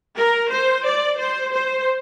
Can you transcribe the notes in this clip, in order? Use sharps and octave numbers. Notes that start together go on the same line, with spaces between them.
A#4
C5
D5
C5
C5